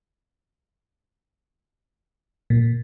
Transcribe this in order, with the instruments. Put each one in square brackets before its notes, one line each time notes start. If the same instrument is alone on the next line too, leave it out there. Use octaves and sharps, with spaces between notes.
[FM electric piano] A#2